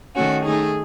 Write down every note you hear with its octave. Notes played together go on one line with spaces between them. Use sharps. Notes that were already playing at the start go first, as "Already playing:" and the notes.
D#3 A3 C#4 F#4
D#3 A3 D#4 G#4